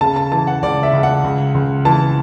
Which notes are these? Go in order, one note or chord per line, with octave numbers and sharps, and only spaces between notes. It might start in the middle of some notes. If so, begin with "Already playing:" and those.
C#3 A5
A5
E3 A5
F#5
C#2 D5
E5
C#2
F#5
C#2
C#2
E3 A5